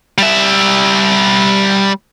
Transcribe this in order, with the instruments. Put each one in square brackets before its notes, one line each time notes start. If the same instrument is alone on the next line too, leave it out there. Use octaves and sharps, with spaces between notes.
[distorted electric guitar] G3 E5